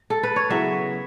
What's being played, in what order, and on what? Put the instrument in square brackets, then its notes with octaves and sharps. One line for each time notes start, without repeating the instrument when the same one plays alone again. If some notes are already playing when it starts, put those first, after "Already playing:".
Already playing: [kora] F#4
A4
B4
C#5
C#3 F#3 B3 E4 E5